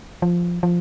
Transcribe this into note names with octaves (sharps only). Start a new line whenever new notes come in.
F3
F3